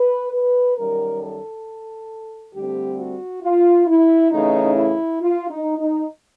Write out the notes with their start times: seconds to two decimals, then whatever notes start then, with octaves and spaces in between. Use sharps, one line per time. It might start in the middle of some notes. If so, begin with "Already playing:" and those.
Already playing: B4
0.33 B4
0.77 F#2 D#3 G3 A#4
1.21 A4
2.54 D2 D3 G3 C4 G4
2.99 F#4
3.43 F4
3.87 E4
4.31 C#3 E3 A3 C#4 D#4
4.75 E4
5.20 F4
5.50 D#4
5.79 D#4